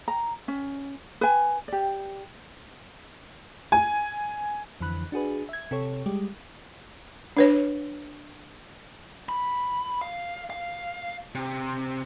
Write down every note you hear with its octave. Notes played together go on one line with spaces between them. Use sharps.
A#5
C#4
B4 G#5
G4 D5
G#5
F2 D3 E3 B5 F#6
D4 F#4 G#4 B4
E5 G#6
C3 A4 C#5
G3 G#3 G4
D4 B4 C#5
B5
F5
F5
C3